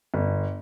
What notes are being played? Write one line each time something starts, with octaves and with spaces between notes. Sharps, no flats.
G1